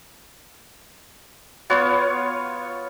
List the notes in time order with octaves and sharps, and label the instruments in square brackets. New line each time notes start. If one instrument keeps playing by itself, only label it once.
[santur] B3 F4 C#5